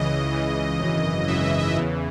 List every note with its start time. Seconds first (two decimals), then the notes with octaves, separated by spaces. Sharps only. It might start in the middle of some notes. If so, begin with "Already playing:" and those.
Already playing: C#2 C#3 E3 D#5
0.32 C#2 C#3 E3
0.80 G#1 F#2 C#3 E3
1.28 G#1 F#2 C#3 E3 E5
1.44 E5
1.60 E5
1.76 E2 C#3 E3